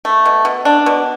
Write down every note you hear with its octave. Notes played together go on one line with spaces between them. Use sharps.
A3
B2
B2
D4
B2